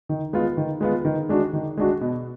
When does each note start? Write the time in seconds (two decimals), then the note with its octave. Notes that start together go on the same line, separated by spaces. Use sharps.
0.09 D#3
0.33 G#3 B3 F4
0.57 D#3
0.81 G#3 B3 F4
1.05 D#3
1.29 G#3 D4 F#4
1.53 D#3
1.78 G#3 D4 F#4
2.01 B2